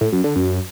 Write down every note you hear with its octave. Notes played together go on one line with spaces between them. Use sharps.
A2
F#2
D3
F#2